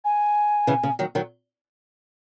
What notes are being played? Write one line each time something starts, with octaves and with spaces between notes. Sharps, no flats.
G#5
C#3 E3
C#3
D#3 F#3
D#3 F#3